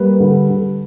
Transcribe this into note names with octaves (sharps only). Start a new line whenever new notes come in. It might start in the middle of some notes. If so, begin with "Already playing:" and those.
Already playing: G3 A#3 B4
D3
D3